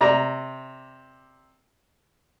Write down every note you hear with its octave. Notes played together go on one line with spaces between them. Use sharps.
C3 D5 A#5